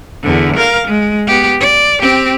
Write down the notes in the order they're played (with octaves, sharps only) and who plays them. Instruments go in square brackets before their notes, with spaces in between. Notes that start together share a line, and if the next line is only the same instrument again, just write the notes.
[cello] E2 D3
A#4 F5
G#3
B3 G4
D5
C4 G4